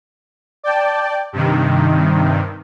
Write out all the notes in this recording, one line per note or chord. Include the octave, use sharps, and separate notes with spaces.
D5 G5 A5
G2 C3 D#3